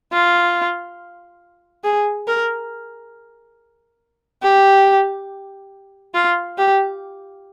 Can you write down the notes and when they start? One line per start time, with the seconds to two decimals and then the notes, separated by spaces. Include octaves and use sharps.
0.12 F4
1.84 G#4
2.27 A#4
4.43 G4
6.14 F4
6.58 G4